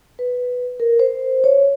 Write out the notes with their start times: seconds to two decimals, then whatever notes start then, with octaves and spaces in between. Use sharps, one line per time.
0.19 B4
0.80 A#4
0.99 C5
1.44 C#5